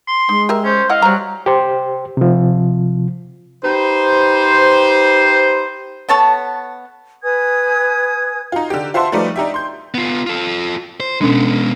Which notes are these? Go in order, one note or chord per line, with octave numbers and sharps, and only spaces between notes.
C6
G#3 D#4
G4 A#4 E5
C#4 C5
E4 D#5 F5 F#5
F#3 G3 C5 A#5
G4 C5
C3 F3
D#4 G4 B4 C5
B3 A4 C#5 A5
B4 G#5 D#6 G#6
D#4 F4
D3 G4
F4 C5 E5 F#5 A5 C6
F3 G3 A3 D#4 B4 D5
D4 D#4 G4 E5
C6 G6
B3 F4
F4 A4
C5
B2 G#3 B3 C#4 D4